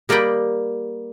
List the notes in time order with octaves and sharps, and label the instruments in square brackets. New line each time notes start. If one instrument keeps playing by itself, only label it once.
[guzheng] G3 A#3 D5 D#5 G5 B5